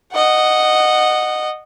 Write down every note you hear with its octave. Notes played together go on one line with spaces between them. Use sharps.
D#5 F#5